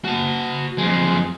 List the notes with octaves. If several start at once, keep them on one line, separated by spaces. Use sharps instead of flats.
F#4 A5
F2 G#3